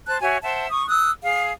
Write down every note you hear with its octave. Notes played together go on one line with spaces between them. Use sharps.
C5 A5 F#6
F#4 C#5 E5 G#5
C5 E5 F#5 A5
C#6 D#6
D#6 E6 F#6
G#4 F5